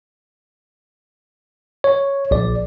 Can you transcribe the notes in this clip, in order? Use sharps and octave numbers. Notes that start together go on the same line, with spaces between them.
C#5
A#1 D5